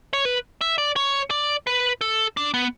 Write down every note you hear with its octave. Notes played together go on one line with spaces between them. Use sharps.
C#5
B4
E5
D5
C#5
D5
B4
A4
D4
B3